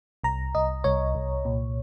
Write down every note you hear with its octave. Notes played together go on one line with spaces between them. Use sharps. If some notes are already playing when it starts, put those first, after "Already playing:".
C2 A#5
C2 D#5
C2 C#5
C2
A#2